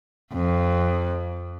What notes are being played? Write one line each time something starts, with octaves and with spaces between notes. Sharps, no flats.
F2